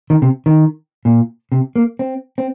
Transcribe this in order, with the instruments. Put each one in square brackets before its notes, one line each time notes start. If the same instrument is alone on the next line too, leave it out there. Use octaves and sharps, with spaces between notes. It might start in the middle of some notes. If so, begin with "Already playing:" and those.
[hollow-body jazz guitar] D#3
C3
D#3
A#2
C3
A#3
C4
C4